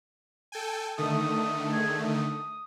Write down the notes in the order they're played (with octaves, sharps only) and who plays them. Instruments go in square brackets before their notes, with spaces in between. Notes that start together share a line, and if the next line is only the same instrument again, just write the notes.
[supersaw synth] A4 G5 G#5
[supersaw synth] D3 D#3 A3 [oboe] D#6
[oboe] G#4
D#6